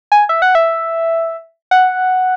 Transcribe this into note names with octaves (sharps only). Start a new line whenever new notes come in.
G#5
E5
F#5
E5
F#5